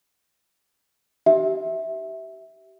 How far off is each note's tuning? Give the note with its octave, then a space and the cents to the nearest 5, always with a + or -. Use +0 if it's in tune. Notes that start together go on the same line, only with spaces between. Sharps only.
G4 -30 E5 -10